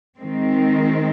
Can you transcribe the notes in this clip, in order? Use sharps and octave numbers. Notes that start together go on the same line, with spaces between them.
D#3 G#3 C4